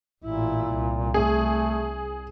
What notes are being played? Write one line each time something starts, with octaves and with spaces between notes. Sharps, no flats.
A1 A#2 E4
C2
A3 G#4